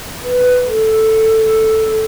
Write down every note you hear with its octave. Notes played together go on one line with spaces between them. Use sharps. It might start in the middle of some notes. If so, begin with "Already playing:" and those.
B4
A4